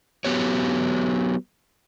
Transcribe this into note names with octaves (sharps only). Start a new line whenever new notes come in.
F#3 B3 G4 C#5